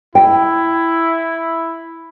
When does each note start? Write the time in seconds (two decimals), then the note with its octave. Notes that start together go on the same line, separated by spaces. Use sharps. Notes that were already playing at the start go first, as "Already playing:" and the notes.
0.15 E4 G5